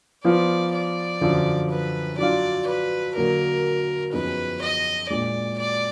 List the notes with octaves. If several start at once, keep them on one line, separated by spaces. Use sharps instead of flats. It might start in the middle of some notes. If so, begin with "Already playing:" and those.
F3 B3 F4 D5
D5
F#2 D3 F3
B4
F#3 D4 F4 D5
B4
D3 F#3 A#3 A#4
F#2 F3 B3 D#4 G#4 B4
D#5
A#2 G#3 D4 D5
D5